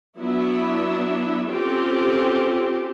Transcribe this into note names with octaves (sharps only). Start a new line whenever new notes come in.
F#3 B3 D4 E4 E5
C4 C#4 F4 G4 A4